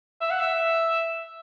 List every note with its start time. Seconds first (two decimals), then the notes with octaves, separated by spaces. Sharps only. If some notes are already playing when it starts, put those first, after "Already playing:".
0.21 E5
0.30 F#5
0.40 E5